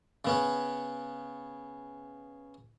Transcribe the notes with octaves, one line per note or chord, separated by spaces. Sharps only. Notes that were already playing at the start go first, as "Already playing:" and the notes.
C#3 B3 C#4